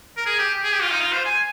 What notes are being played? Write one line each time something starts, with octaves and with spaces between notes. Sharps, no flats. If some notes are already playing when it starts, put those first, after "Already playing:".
A#4
G#4
G4
G#4
G4
F4
D#4
F4
C5
G#5